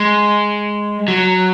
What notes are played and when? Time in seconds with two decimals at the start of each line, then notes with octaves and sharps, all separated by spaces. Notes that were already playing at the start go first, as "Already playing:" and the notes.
Already playing: G#3
1.08 F#3